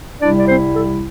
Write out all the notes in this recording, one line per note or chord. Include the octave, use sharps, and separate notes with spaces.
C2 C3 G3 D4 E4 D5
D5
C4 C5
A4